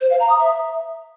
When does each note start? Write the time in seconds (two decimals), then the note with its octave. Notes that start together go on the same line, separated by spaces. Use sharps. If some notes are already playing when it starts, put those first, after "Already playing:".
0.01 C5
0.10 F5
0.20 A#5
0.29 D#6
0.39 E5